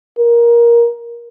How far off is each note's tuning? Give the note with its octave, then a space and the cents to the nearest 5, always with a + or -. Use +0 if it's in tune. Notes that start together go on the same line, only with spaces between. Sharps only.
A#4 +15